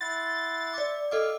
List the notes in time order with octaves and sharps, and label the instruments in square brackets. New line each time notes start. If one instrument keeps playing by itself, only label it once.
[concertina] E4 F#5 C6 [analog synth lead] A6
[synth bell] D5 D6 [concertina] E5
[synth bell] A4 D#5 D6 [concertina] F5 E6